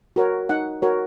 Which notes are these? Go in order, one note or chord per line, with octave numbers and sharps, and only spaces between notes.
F#4 A#4 C#5
D#4 F#5
F#4 A#4 C#5